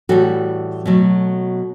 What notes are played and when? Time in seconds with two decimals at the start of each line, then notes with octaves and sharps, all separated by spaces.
0.09 A2 E3 G3 F#4 A4
0.86 B2 F#3 A3